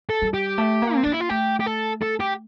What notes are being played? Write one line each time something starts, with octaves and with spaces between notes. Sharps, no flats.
A4
G3
G4
A3
A#3
C4
A#3 D4
E4
F4
A3 G4
G4
A4
A4
G4